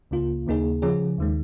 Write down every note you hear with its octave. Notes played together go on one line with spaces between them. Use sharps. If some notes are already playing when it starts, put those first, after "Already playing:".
C#2 C#3 A#3 F4
D#2 C#3 A#3 D#4 G#4
C#3 F3 C#4 G#4
D#2 D#3 G#3